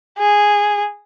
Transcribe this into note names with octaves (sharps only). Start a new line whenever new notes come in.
G#4